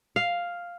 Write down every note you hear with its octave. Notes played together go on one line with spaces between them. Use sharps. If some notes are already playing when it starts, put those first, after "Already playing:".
F5